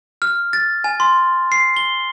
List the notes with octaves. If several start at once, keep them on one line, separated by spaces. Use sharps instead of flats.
F6
A6
G#5
C6
C7
G7